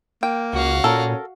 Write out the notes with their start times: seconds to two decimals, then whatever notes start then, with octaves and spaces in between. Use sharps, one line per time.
0.23 A#3 G5
0.53 C#2 F#4 F5
0.84 A#2 C#4 A4 A#4